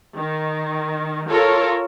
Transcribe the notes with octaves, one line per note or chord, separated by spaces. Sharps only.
D#3
F4 A4 A#4 C#5